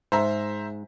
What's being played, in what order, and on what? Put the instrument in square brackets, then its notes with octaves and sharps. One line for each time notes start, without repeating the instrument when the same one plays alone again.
[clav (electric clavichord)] G#2 [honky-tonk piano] C5 E5 A#5